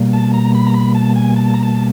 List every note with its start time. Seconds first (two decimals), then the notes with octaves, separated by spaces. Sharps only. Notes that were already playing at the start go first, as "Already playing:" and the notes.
Already playing: B2 G3 A#3
0.13 A5
0.34 A#5
0.55 B5
0.67 A#5
0.74 B5
0.95 A5
1.16 G#5
1.36 A5
1.54 A#5
1.63 A5